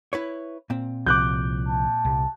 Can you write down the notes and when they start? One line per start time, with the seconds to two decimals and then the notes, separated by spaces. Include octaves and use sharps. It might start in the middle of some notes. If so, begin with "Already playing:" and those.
0.13 E4 B4 C#5
0.70 A#2 C4
1.06 C2 F3 D6 F#6 G6
1.69 A5
2.05 C2